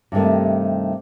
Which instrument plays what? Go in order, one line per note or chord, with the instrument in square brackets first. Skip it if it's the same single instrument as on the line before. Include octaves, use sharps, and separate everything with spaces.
[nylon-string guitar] G2 C3 D#3 A3